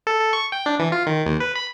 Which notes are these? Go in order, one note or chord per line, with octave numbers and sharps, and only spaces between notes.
A4
A4
C#6
G5
D4
E3
F4
D#3
D#2
B4
B5